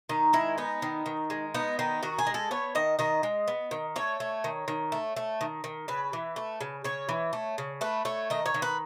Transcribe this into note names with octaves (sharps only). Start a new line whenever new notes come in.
D#3 D#4
G#3 E4
B3 D#4
D#3
D#3
G#3
B3 D#4
D#3 D#4
D#3 F#4
G#4
G#3
A4
B3 C#5
D#3 D#5
D#3 D#5
G#3
B3
D#3
A3 C#5
A3
D#3
D#3
A3
A3
D#3
D#3
C#3 B4
E3
A3
C#3
C#3 C#5
E3
A3
C#3
A3 B4
A3 C#5
D#3 D#5
C#5
D#3
B4